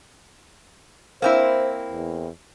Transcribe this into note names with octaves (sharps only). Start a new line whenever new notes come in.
A#3 C4 E4 C5
E2